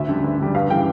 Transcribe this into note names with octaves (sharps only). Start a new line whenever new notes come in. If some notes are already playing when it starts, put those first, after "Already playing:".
Already playing: D2 E5
D3 G3
D2
D3 G3
G2 F5
E3 G3 G5